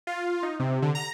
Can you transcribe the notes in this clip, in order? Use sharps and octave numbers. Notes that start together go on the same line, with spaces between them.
F4
D#4
C3
D3
A#5